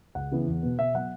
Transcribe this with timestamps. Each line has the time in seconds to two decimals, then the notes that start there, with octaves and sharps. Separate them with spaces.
0.15 C#2 F#5
0.31 C#3 E3 B3
0.47 E2
0.63 B2 B3
0.79 B2 E5
0.95 F#3 B3 F#5